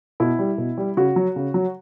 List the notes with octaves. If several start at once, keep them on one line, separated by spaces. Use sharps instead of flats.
B2 E4
G3
B2
G3
C#3 F#4
F#3
C#3
F#3